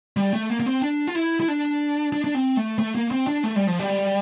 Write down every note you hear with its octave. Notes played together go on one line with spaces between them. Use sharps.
G3
A3
A#3
A#3
C4
D4
F4
E4
E4
D4
D4
D4
C4
A3
A3
A#3
C4
D4
A3
G3
F3
G3